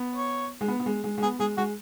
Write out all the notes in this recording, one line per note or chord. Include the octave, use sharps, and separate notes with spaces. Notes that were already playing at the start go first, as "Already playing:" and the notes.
Already playing: B3
C#5
G#3
B3
B3
G#3
G#3
G#3
B3 G#4
G#3 G#4
G#3 F#4